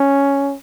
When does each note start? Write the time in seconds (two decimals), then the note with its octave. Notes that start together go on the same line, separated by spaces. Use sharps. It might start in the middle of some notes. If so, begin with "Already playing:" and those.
Already playing: C#4